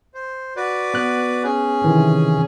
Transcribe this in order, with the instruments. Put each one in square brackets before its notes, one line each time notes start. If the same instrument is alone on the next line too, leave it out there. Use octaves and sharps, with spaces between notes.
[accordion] C5
F#4 B4 D5
[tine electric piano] B3 F#6
[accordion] C#4 G#4
[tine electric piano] C3 D#3 E3